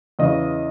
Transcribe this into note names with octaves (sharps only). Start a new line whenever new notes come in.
E2 C#3 E3 D#5